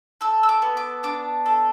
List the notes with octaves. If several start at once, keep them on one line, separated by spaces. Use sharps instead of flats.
A4 E6
E6
D6
B3
D6
D4 D6
A4